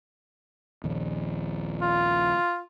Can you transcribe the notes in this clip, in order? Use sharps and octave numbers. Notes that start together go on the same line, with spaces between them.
A#1 D#2
F4